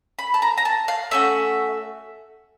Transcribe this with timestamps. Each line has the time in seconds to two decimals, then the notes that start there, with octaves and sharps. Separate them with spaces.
0.19 B5
0.34 A5
0.42 A#5
0.58 A#5
0.65 A5
0.88 F5
1.11 A3 C#4 F#4 E5